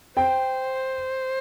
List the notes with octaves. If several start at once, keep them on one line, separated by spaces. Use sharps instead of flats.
C5 G5